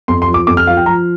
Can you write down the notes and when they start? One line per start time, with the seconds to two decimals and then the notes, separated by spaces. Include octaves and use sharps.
0.08 F2 C6
0.22 C6
0.28 F3
0.34 D6
0.47 F2 D6
0.57 F6
0.67 F3 F5
0.77 G5
0.86 F3 A#5